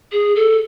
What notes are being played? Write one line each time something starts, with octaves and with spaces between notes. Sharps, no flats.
G#4
A4